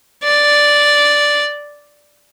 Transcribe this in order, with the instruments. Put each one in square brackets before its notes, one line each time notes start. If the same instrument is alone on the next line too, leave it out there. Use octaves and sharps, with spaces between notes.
[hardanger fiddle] D5